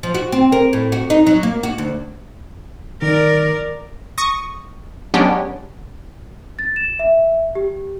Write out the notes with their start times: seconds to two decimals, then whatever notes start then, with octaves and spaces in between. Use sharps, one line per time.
0.03 F3
0.14 F#4
0.32 C4
0.52 A#4
0.73 A2
0.92 F#4
1.10 D#4
1.27 F#3
1.43 A#3
1.63 F#4
1.78 D2
3.02 D#3 A#4 D5
4.18 C#6 D#6 A#6
5.14 F#3 G#3 B3 C#4 D4 G4
6.59 A6
6.76 E7
6.99 E5
7.55 G4